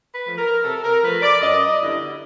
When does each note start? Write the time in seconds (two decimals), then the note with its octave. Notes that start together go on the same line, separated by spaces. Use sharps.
0.11 B4
0.25 F3 A3
0.38 A#4
0.63 C3 A4
0.83 A#4
1.02 F3 A3 B4
1.21 D5
1.41 F#2 D#5
1.80 D3 G3 B3 E4